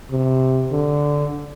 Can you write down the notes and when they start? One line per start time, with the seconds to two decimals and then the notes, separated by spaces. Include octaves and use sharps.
0.11 C3
0.71 D3